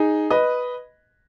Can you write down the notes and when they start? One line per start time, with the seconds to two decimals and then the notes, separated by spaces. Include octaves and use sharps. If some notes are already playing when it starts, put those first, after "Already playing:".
Already playing: D#4 G#4
0.31 B4 D#5